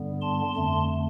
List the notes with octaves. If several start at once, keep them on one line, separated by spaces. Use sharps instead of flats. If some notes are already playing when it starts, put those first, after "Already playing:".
Already playing: G2 D3 G3 B3
A5 C6
F2 D3 A3 A5 C6